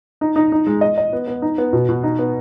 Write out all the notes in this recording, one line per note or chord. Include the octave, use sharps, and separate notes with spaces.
D#4
D#4
D#4
G#3
D#5
D#5
B3
B3
D#4
B3
B2
B2
D#4
B3